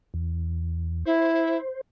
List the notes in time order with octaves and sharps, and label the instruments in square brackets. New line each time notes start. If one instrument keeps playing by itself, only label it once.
[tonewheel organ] E2
[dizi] E4 [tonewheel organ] C5